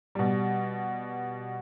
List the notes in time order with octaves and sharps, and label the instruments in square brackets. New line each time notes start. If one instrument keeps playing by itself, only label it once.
[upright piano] B2 G3